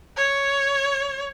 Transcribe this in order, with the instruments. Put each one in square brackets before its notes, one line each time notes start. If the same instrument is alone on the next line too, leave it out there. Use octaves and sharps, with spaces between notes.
[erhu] C#5